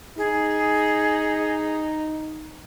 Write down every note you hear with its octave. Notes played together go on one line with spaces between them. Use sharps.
D#4 G#4